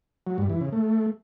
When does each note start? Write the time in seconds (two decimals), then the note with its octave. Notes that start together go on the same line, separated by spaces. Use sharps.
0.27 F#3
0.38 G2
0.50 E3
0.61 C#3
0.73 A3